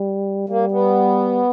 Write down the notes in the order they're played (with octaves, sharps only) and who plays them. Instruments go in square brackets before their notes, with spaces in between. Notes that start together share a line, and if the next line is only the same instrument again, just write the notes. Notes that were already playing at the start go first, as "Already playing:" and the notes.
Already playing: [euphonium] G3
[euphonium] G3 [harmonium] A#3
[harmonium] B3